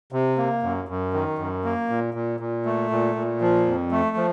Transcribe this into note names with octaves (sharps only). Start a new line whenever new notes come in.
C3
A#3
F#2
F#2
D#3
F#2
A#3
A#2
A#2
A#2
A3
A#2
A#2
F3
F2
A3
F3